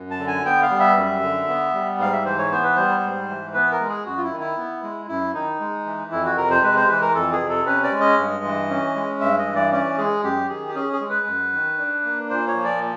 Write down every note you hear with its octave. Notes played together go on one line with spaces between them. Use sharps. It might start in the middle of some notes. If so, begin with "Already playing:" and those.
Already playing: F#2
A5
D3
G#5
B3 G5
F5
G3
E5
F#2
D3
B3
G3
G#2 F5
E5
E3 C5
C#5
B3 C5
B4
G3 C5
G#2
E3
B3 B4
A#4
G#3
G#4
F#2 F#4
F4
E4
D#3
E4
B3
G#3
F#2 E4
D#3 D#4
G#3
E3
F2 E4
F#4
C3 A#4
C5
G#3 B4
C5
E3 B4
A#4
F2 A4
G#4
C3
A4
C#4 B4
D5
G#3
D#5
G2
E3
C#4
G#3
G2 E5
D#5
E3
D5
C#4 D5
G#3 G#4
F#2 G4
D#3 G#4
G4
C#4 G#4
G#4
G#3
B4
F#2
D#3
D4
A#3
A#2 C5
C#5
F3
D5